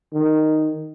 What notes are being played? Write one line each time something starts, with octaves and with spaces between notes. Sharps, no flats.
D#3